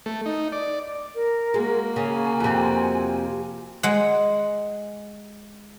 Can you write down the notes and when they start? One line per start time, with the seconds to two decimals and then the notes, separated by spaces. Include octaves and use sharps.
0.06 A3
0.26 D#4
0.52 D5
1.15 A#4
1.54 G#3 A#3 F#4
1.96 C#3 G#5
2.40 F2 C3
3.83 G#3 F#5